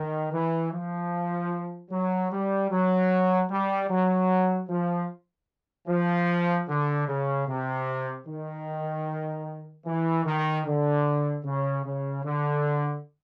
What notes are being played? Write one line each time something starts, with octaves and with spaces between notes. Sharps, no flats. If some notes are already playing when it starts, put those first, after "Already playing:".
Already playing: D#3
E3
F3
F#3
G3
F#3
G3
F#3
F3
F3
D3
C#3
C3
D#3
E3
D#3
D3
C#3
C#3
D3